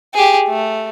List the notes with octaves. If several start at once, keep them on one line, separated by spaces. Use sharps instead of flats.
G4 G#4
A3